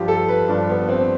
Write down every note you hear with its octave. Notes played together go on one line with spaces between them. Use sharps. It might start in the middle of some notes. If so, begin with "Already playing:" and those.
Already playing: G2 F3 F4 G4
A4
B4
G2 F3 D4
B3
C4